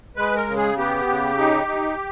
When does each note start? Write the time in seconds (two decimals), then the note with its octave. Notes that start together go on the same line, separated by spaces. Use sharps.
0.16 G#3 B4
0.36 A#4
0.47 C#3
0.56 G#4
0.77 B3 G4
1.08 C#3
1.38 D#4
1.68 D#4